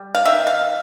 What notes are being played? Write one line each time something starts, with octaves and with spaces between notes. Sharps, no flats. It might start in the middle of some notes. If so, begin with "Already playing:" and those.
Already playing: G3
F5
D#3 E5
F5